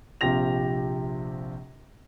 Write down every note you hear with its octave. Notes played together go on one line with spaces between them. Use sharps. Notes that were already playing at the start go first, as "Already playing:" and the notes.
A#1 C3 F4 G4 A#6 F7